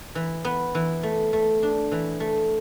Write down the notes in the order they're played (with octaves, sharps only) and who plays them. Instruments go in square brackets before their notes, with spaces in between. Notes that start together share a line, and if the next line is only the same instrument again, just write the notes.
[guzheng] E3
B3
E3
A3
A3
D4
E3
A3